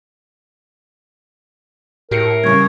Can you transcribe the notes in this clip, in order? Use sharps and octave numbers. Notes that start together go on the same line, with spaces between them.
A2 G4 A#4 C7 C#7
G2 C#3 C#6 G#6